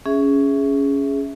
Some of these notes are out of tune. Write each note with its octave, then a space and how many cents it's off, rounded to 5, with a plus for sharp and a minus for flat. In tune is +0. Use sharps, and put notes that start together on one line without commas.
C#4 +10 G#4 +0 E5 +0